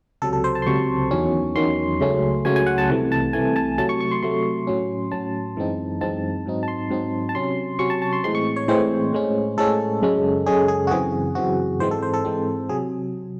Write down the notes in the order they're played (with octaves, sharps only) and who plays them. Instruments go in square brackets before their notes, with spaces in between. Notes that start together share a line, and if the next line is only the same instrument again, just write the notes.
[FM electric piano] C#2 C3 F#3 A4
A4
C5
A5
C6
C#2 C3 F#3 C#6
E2 D#3 F#3 C#4
E2 D#3 F#3 C#4 C6
C#2 C#3 F#3 A3 C#4
C#2 C#3 F#3 A3 C#4 G#5
G#5
F#5
A5
C2 C3 E3 A3
A5
C2 C3 E3 A3 G#5
A5
C3 F#3 A3 A5
C#6
C#6
C6
C3 F#3 A3 C6
A2 F#3 C#4
A2 F#3 C#4 A5
F#2 E3 G#3 C4 D#4
F#2 E3 G#3 C4 D#4 A5
G#2 F#3 C4 D#4
A5
C6
G#2 F#3 C4 D#4
A5
C3 F#3 C#4 C6
C3 F#3 C#4 C#6
A5
A5
C6
A2 E3 G#3 C4 C6
C#6
C#5
A2 E3 G#3 C4 C5
A2 G#3 C#4
A2 G#3 C#4 A4
F#2 C#3 G#3 C#4
F#2 C#3 G#3 C#4 G#4
G#4
F#4
F#2 C#3 E3 C4 G#4
F#2 C#3 E3 C4 F#4
G#2 E3 G#3 C4 C5
A4
C5
A4
G#2 E3 G#3 C4
C3 F#3 G#4